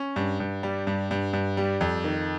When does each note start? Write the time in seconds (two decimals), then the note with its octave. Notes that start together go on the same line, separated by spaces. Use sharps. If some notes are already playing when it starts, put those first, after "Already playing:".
Already playing: C#4
0.16 G2
0.40 G2
0.63 G3
0.87 G2
1.11 G2
1.33 G2
1.57 G3
1.81 F2
2.04 D#3